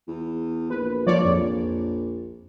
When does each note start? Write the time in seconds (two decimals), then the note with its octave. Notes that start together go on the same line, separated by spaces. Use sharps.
0.08 E2
0.70 A#1 B4
1.07 A#1 F3 C#5 D5
1.25 F2